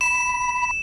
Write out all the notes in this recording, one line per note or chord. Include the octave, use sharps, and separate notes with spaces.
B5 E7